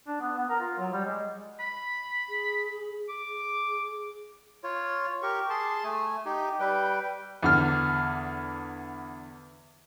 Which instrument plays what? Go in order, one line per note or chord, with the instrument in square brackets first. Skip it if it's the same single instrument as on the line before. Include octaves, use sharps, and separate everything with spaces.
[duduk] D4
B3
B3
A#4
F4
F#3
G3
G#3
[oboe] B5
[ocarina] G#4
[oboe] D6
[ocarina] G#4
[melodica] F4 C#5
G4 A#4 C#6
G#4 A5 C6
A3 G#5
D#4 G4
G3 B4 G5
[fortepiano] E2 D3 F6